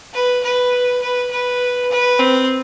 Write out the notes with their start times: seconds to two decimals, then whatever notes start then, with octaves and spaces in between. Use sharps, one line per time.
0.14 B4
0.43 B4
1.02 B4
1.31 B4
1.91 B4
2.20 C4